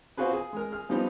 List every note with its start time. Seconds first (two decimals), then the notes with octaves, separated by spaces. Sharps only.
0.17 C4 F4 F#4 G#4 B4
0.33 G#4
0.53 G#3 A#4
0.72 G#4 F6
0.89 F3 G3 B3 C4 D#4 G4